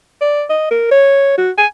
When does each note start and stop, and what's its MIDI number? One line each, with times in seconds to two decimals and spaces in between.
0.21 0.43 74
0.50 0.67 75
0.71 0.89 70
0.91 1.36 73
1.38 1.50 66
1.58 1.66 80